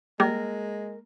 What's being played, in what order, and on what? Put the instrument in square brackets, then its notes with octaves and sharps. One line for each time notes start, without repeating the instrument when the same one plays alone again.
[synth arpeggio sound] G3 [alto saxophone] G#3 [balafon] A#3 [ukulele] A#4